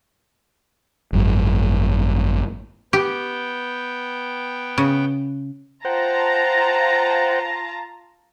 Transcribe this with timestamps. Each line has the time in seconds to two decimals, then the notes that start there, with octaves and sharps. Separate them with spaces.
1.13 G#1 F#2
2.93 B3 G4 G5
4.78 C#3
5.85 F4 C5 F#5 G5 A5 A#5